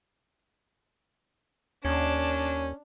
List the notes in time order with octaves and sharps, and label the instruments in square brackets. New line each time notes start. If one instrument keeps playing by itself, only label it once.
[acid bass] D#2 [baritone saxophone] C#4 [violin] D4